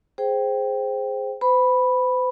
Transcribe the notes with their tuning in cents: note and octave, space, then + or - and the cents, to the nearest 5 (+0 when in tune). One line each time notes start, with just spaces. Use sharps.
G#4 +0 C5 +0 G5 +0
C5 -45 B5 -5